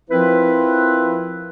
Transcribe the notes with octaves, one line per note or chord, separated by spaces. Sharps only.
F3 C4 E4 F4 A#4 B4